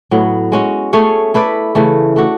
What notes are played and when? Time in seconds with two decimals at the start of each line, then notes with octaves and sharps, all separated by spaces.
0.11 A2 F#3 B3
0.52 G#3 C#4 F#4
0.93 A3 C#4 G#4 C#5
1.34 A3 E4 B4 D5
1.75 C#3 E3 A3
2.16 A3 D4 F#4